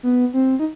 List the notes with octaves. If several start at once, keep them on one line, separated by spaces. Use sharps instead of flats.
B3
C4
D#4